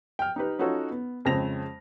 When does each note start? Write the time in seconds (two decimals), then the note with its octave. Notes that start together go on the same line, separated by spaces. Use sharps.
0.19 G5 F6
0.36 D#4 G4 B4
0.59 C#4 D#4 F4 F#4 A4 C#5
0.91 B3
1.25 F2 C#3 G#3 C4 A#6 F7